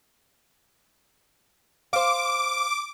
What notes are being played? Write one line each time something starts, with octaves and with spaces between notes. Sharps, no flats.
C5 F5 D6